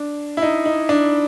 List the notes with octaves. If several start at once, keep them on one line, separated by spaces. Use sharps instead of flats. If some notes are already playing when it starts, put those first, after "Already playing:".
Already playing: D4
E4
D#4
D#4
D4